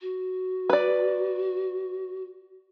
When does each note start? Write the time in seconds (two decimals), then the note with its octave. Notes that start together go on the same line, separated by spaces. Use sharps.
0.01 F#4
0.70 B4 D5